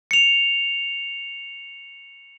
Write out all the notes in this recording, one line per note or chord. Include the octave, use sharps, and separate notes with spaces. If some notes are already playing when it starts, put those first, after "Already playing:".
C#7 F7